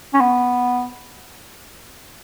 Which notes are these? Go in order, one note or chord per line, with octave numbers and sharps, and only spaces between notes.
C#4
B3